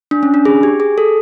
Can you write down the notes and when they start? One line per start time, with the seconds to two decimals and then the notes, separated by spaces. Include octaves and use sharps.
0.11 D4
0.23 C#4
0.34 D4
0.45 G#4
0.63 G4
0.80 G#4
0.98 A4